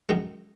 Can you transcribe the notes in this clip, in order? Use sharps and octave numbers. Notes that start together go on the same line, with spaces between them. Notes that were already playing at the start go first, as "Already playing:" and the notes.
F#2 D#3 G#3